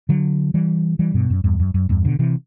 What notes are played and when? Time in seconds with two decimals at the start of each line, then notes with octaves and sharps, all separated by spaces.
0.09 D3 F#3
0.54 E3 G3
0.99 E3 G3
1.14 G2 B2
1.30 F#2
1.44 E2 G2
1.60 F#2
1.74 F#2
1.89 E2 G2
2.05 B2 D3
2.19 C3 E3